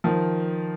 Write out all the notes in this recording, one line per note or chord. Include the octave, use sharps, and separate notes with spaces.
D#3 F3